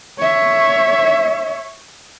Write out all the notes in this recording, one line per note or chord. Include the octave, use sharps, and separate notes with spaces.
C#5 E5